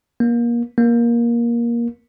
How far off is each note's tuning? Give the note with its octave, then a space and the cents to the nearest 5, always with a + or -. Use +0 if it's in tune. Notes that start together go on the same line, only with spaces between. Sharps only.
A#3 +25
A#3 +15